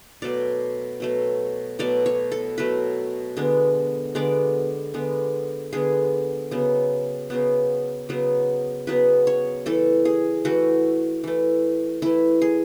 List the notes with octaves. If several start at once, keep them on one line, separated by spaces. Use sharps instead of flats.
B2 F#3 A3 D5
B2 F#3 A3
B2 F#3 A3 D5
C#5
A4
B2 F#3 A3 B4
D3 G#3 B3
D3 G#3 B3 D5
D3 G#3 B3
D3 G#3 B3 G#4
C#3 F#3 B3
C#3 F#3 B3
C#3 F#3 B3
C#3 F#3 B3 B4
C#5
E3 A3 A4
G#4
E3 A3 F#4
E3 A3
E3 A3 E4
G#4